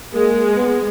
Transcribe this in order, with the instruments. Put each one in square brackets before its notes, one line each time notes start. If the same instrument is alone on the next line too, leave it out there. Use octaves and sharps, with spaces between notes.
[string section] G#3 [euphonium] A#3
[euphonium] B3